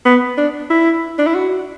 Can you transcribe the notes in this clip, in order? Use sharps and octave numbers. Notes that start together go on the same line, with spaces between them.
B3
D4
E4
D4
E4
F#4